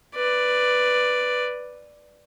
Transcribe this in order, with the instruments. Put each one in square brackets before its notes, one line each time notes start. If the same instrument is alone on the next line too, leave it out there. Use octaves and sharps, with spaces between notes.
[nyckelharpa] B4 D5